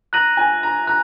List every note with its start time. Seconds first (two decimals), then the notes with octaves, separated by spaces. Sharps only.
0.13 A#5 F#6 A#6 D#7 F#7
0.37 G#5
0.63 A#5
0.87 A#5 F#6